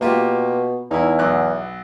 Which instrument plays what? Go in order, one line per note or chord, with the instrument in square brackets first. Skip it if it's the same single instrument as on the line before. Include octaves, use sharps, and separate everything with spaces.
[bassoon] B2 [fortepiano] A#3 F4 G4
[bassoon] E2 [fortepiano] D#4 E4
[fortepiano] B1 F#6